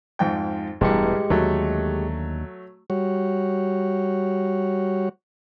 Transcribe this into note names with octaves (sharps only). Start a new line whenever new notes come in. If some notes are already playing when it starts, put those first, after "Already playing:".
F2 G#2 G5
E1 A1 G2 B2 E3 G#3 G4 C#7
D#2 D3 F#3 A3
G3 F#4 C#5